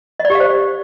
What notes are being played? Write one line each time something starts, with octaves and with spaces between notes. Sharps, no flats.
D#5
D5
G4
F5
C5